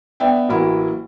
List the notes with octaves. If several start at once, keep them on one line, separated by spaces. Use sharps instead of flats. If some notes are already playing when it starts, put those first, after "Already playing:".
B3 D4 E5 G5
A1 F#3 A#3 E4 B5